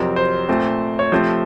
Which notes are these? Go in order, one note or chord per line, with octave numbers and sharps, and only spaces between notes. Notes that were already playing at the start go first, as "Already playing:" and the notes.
Already playing: F2 C3 F#3 C4 A#4
C5
A#2 A3 C4
C#5
C3 F3 A3 C4 C5